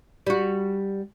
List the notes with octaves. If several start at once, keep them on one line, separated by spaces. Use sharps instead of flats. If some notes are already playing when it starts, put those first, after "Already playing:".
G3 F#4